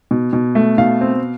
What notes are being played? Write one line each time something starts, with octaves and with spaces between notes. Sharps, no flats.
B2
B2
A3
B2 F5
C4